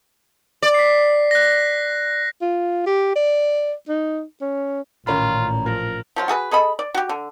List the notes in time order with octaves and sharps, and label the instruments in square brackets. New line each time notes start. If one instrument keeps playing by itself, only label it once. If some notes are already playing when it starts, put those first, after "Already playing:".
[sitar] D5
[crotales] B6 C7
F#6 A#6
[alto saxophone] F4
G4
D5
D#4
C#4
[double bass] A1 A#2 [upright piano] D#3 C#4 B5 [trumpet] F4 [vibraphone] A#5
[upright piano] F3 [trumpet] A#4
[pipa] F3 F#3 F4
F#4 G#4 A4 B4
G#4 A4 D#5 B5
D5
F#4 G4
D3